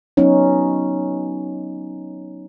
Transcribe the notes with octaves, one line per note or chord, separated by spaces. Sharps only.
F#3 B3 C#4 D#4